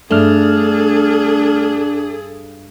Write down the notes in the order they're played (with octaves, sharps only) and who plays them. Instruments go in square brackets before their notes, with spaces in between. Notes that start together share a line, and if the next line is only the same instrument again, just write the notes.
[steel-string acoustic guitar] G2 [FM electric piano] A3 F6 [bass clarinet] D4 [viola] G#4 A4